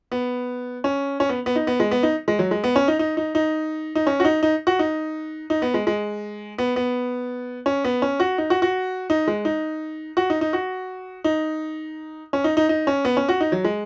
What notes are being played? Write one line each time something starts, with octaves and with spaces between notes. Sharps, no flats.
B3
C#4
C#4
B3
B3
D#4
B3
G#3
B3
D#4
G#3
F#3
G#3
B3
C#4
D#4
D#4
D#4
D#4
D#4
C#4
F#4
D#4
D#4
F#4
D#4
D#4
B3
G#3
G#3
B3
B3
C#4
B3
C#4
F#4
D#4
F#4
F#4
D#4
G#3
D#4
F#4
D#4
D#4
F#4
D#4
C#4
D#4
D#4
D#4
C#4
B3
C#4
F#4
D#4
F#3
G#3